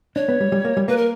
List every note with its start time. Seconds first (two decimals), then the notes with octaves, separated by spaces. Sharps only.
0.16 D4 C#5
0.28 B3
0.40 G3
0.52 G3
0.65 A#3
0.77 G3
0.88 A#3 B4
0.97 A#4